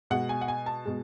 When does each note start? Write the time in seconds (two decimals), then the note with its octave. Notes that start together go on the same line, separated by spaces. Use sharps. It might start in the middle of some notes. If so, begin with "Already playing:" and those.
0.10 B2 G#3 F#5
0.29 G#5
0.41 F#5
0.48 G#5
0.66 A5
0.85 B2 G#3